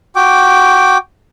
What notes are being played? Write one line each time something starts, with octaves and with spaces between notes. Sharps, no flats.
F#4 G5 D6